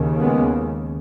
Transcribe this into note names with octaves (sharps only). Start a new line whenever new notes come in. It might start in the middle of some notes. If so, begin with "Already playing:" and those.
Already playing: D#2 C#3
G#3 B3